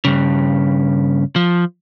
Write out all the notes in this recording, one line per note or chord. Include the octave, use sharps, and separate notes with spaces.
G2 C#3
F3